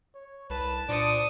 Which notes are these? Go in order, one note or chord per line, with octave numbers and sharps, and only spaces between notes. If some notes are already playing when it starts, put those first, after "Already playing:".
C#5
C2 B4 A5
A#2 D4 C5 D#6 C#7